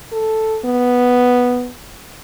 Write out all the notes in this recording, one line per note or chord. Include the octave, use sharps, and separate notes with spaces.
A4
B3